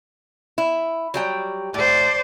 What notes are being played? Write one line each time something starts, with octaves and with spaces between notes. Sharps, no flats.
E4
F#3 G3 G5
A2 C5 D5